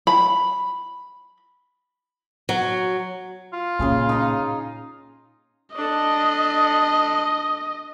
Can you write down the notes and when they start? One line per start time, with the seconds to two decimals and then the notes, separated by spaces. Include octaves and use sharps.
0.07 B5
2.49 F#3
3.53 F4
3.79 A#2 C#3 G#4 C6
4.09 D#4 D#5
5.76 D4 A4 D#5